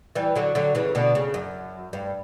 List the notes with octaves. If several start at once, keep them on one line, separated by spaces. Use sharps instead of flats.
E3 G3
D3 F#3
D3 F#3
C#3 E3
B2 D3
C#3
F#2
G2